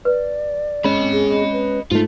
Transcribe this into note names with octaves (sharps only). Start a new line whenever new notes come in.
B4 D5
G#3 C#4 D#5 B5
G#4
B4
G#2 A3 D#4 F4